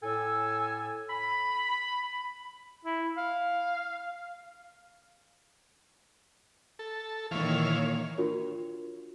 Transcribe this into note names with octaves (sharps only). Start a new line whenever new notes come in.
A2 A4 G#5 E6
B5
E4
F5
A4
A#2 D#3 E3 C#5 F5
D4 F4 F#4 A#4 C#5